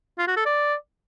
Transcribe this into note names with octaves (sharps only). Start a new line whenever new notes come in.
F4
F#4
A4
D5